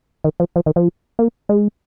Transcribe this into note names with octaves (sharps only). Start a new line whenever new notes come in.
D#3
F3
F3
D#3
F3
A#3
G#3